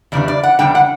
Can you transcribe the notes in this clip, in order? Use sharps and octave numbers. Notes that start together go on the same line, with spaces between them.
E2 C#3 G3 D4 D5
D5
F#5
E2 C#3 G3 D4 G5
F#5